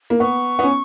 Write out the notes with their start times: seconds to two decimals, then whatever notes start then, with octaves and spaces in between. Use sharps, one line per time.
0.10 A#3
0.20 B3 C#6
0.59 B3
0.63 C#4